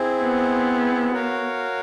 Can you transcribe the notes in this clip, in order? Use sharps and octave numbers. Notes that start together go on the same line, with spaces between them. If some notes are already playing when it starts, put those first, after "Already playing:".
Already playing: C4 E4 G#4 C5
B3
F#4 A#4 C#5 F5